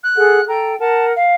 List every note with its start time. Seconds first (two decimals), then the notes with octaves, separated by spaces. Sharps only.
0.03 F#6
0.17 G#4 A4 F#5
0.48 A4 G5 A#5
0.80 A#4 F#5 A5
1.16 F5